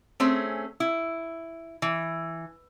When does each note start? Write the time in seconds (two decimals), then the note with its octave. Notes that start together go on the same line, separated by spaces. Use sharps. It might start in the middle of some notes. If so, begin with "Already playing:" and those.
0.20 A3 C4 C#4 G#4
0.80 E4
1.82 E3